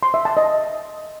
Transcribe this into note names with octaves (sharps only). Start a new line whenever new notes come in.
C6
E5
A5
D#5